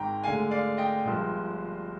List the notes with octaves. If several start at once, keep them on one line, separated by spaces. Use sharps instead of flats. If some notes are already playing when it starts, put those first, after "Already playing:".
Already playing: G#1 G#2 D#3 G#3 G5 A#5
D2 D3 G#3 F5 G#5
D5 F5
D#5 G5
G1 G2 F3 G#3